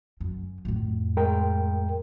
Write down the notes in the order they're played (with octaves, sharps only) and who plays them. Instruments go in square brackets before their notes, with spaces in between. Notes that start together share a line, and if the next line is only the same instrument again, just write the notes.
[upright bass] F#2
F2 A2
[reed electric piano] G#3 A#4 G5